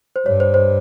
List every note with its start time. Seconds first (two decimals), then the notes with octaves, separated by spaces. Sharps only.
0.16 C5
0.26 G2 C#5
0.40 C5
0.54 C5